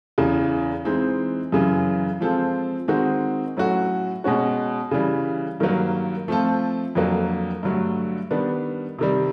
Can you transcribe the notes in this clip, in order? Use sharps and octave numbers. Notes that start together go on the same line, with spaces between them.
E2 C#3 E3
E3 G#3 C4 D#4
F#2 C#3 E3
F3 G#3 C4 F4 A4
D#3 G#3 C4 D#4 F#4
A2 F#3 A3 C#4 F#4
B2 G#3 C#4 F#4
C#3 E3 G3
G2 D#3 F#3 A#3
F3 A3 C4 F4 A4
F2 D3 F#3 A#3
G2 D3 F#3 A3
D#3 G3 B3 D4
C3 D#3 G3